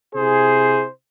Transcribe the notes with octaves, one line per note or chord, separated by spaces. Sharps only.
C3 E4 G#4 C5